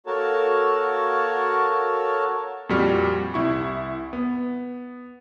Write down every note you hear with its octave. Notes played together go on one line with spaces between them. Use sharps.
A#3 F#4 A4 A#4 C#5 A5
F2 A#2 G3 F#4 F6
C2 E4 C#6
B3